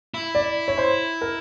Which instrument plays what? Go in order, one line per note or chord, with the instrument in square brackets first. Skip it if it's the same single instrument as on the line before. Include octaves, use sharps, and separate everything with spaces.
[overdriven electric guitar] E4
[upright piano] D5
C#5
C5
A#4